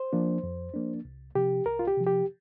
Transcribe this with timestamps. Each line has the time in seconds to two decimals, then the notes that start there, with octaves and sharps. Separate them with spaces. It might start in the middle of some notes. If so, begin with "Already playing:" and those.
Already playing: C5
0.13 F3 A#3 D4
0.43 F2
0.74 F3 A#3 D4
1.05 C2
1.35 C3 F3 G4
1.66 C2 A#4
1.79 F4
1.87 G4
1.97 C3 F3
2.07 G4